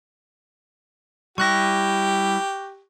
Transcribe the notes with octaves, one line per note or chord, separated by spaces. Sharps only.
G3 E4 G4 C#6 F#6 A#6